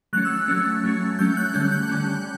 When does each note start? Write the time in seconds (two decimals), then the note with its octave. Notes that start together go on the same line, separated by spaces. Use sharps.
0.13 F#3 A3 C#4 F#6
0.25 E6
0.48 F#3 A3 C#4
0.84 F#3 A3 C#4
1.19 F#3 A3 C#4 G6
1.37 F#6
1.54 D3 G3 C#4 G6
1.72 F#6
1.89 D3 G3 C#4